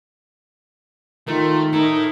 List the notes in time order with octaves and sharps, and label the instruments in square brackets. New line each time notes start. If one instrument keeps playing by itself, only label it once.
[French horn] D#3 [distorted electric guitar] A3 [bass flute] F4 [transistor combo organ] A#4
[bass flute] D#4 [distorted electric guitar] E4 A4